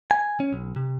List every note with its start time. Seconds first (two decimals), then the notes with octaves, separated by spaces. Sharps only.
0.11 G#5
0.40 C#4
0.53 B1
0.76 C3